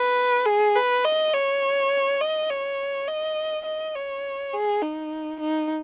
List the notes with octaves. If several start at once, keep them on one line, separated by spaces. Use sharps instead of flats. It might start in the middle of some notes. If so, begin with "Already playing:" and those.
Already playing: B4
G#4
B4
D#5
C#5
D#5
C#5
D#5
D#5
C#5
G#4
D#4
D#4